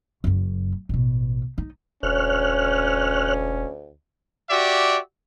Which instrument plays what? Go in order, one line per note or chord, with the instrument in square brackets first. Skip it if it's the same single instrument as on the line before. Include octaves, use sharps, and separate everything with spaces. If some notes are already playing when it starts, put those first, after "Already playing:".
[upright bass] F#1 F#2
A1 B2
D#4
[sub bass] E1 [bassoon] D2 [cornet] C#4 [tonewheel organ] C#5 F6 F#6
[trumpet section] F#4 G4 D5 E5